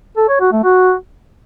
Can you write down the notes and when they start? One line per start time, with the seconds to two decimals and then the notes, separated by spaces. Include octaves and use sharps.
0.17 A4
0.29 C#5
0.41 F#4
0.52 A3
0.64 F#4